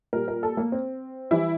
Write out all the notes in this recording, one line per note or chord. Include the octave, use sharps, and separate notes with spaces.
A#2 G3 A#4
A#4
A4
A#3
C4
E3 G3 E4